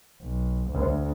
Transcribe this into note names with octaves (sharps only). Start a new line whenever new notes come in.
B1
D2